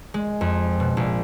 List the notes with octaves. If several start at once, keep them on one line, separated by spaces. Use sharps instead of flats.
G#3
F2
B2
A#1